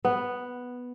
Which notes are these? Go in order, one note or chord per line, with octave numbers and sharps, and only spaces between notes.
B3